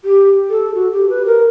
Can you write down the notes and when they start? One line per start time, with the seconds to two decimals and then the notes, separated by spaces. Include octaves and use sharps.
0.05 G4
0.50 A4
0.75 F#4
0.92 G4
1.09 B4
1.26 A#4